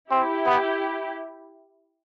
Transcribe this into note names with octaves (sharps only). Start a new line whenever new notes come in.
C4 E4 G4
B3